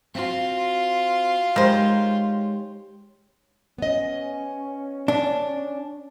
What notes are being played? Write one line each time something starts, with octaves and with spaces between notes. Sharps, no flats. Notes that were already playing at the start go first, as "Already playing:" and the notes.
C4 F4 F#4
D#3 G#3 G4 C5 C#5
B3 C#4 D#5
D4